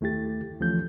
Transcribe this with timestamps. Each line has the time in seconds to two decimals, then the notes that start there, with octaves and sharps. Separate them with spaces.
0.01 D#2 A3 E4 G4 A6
0.60 D2 E3 F3 A3 C#4 G6